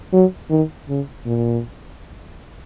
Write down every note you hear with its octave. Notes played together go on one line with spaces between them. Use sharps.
F#3
D#3
C#3
A#2